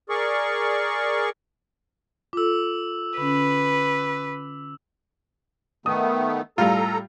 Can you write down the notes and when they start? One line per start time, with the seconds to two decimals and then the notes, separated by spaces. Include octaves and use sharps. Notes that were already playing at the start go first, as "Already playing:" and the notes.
0.09 G#4 A#4 D5 C#6
2.33 F4 A4 D6 E6
3.17 D3 C#4 B4
5.86 D#3 A3 B3 D#6
6.58 A2 G3 F4 A4 F5 A#5